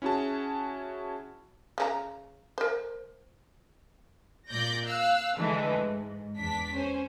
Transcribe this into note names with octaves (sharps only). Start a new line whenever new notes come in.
C#4 E4 F#4 G#4 A5
C#3 C4 A#5
A#4 C5
A#2 D5 G6 A#6
F5 E6 F#6
D3 E3 G#3 A3
G#2
E2 D4 B6
C#4 C5